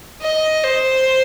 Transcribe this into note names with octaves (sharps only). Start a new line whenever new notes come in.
D#5
C5